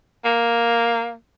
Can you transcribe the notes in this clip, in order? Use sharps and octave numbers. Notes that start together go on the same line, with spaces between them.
A#3